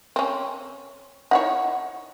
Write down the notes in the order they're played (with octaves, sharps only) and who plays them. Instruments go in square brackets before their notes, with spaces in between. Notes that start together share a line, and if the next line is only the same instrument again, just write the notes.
[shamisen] C4 C#4
[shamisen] D#4 E4 C#5 [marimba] F#5